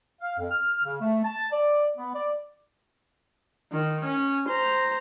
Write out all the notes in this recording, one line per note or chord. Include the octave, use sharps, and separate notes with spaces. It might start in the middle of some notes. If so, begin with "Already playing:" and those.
F5
F2
F6
C#3
A3
A5
D5
B3
D5
D#3
C#4
C5 A#5